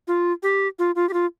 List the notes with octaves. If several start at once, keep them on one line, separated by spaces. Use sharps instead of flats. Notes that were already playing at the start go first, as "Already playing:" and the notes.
F4
G4
F4
F4
G4
F4